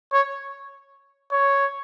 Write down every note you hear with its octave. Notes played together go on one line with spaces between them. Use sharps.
C#5
C#5